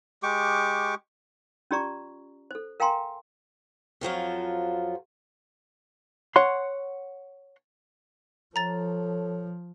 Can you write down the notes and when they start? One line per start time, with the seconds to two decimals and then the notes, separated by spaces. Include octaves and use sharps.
0.23 G#3 G4 C#6 D6
1.71 C#4 F4 G4 D5 A#5 C#6
2.51 A4 C5
2.80 A#4 F5 G5 G#5 A#5 C6
4.01 F2 F3 F#3 F4
6.36 C#5 F#5 C6
8.56 F3 A4 C#5 A#5 A6